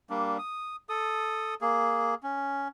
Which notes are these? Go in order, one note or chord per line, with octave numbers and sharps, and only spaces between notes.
G3 A#3 D4
D#6
A4 D#6
A#3 G#4
C#4